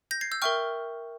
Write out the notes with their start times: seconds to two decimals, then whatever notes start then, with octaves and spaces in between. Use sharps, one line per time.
0.11 G6 A#6
0.21 G#6 C7
0.32 E6 G6
0.42 A#4 E5 G5 C#6 F6